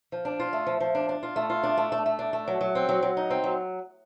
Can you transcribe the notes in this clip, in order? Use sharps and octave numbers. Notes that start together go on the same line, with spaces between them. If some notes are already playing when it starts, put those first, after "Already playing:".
F3
D4
F4
A3
F3
F3
D4
D4
F4
A3
F4
D4
A3
A3
A3
D4
A3
F#3
F#3
C4
F#3
F#3
D#4
C4
F#3